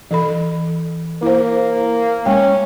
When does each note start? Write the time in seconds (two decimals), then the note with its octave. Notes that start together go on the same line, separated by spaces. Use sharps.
0.11 E3 A4 B5
1.22 A#3 E4 C5
2.25 G#3 C#4 G5